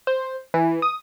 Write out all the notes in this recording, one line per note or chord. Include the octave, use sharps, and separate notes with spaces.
C5
E3
D#6